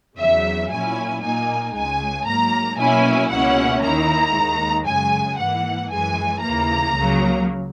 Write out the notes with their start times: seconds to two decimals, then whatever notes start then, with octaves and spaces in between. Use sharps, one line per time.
0.19 E2 C#3 F#3 E5
0.72 A#2 F#3 C#4 E4 G#5
1.23 A#2 A#3 D#4 G#5
1.75 C#2 C#3 G#3 G#5
2.27 G#2 F#3 A#3 A#5
2.79 B2 F#3 A#3 C#4 E4 G#5
3.31 C#2 B2 A#3 C#4 E4 F#5
3.83 D#2 D#3 A#3 E4 A#5
4.35 D#2 D#3 G#3
4.86 F#2 C#3 G#3 G#5
5.38 G#2 E3 A#3 F#5
5.91 F#2 E3 G#3 G#5
6.42 D#2 C#3 E3 A#3 A#5
6.95 C#2 C#3 F#3 A#3